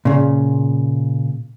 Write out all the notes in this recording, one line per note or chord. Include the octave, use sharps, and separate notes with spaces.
A#2 C#3